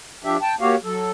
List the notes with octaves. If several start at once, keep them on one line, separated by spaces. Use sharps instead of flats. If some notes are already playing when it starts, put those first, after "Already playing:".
F3 D4 G4 E5
G5 A5
A#3 F#4 G4 C#5 F5
F#3 A4